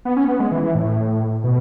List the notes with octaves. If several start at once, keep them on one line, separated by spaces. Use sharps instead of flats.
B3
C#4
B3
G#3
E3
E3
A2
B2